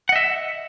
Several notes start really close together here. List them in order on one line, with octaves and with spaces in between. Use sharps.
F#5 D#5 E5